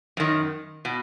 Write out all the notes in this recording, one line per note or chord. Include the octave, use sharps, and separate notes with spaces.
F#2 D#3
B2